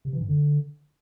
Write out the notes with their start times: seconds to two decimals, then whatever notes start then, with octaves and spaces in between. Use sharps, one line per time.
0.05 C3
0.13 E3
0.21 G2
0.28 D3